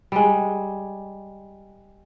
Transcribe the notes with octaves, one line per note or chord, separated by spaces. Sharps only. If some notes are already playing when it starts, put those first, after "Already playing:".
G3 G#3